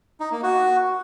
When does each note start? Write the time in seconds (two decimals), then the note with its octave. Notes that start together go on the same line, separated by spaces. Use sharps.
0.20 D#4
0.32 A#3
0.43 F#4